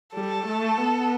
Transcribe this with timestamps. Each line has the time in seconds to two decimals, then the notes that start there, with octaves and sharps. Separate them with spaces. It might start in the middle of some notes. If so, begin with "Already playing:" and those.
0.14 G3 A4
0.46 A3
0.77 B3